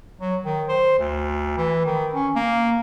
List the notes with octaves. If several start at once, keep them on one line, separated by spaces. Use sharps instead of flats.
F#3
D#3
C5
D2
E3
D#3
C#4
A#3